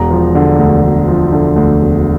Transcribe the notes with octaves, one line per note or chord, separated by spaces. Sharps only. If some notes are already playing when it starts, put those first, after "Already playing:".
Already playing: E1 A#5
F3
D3
D2
E1
F3
D3
D2
E1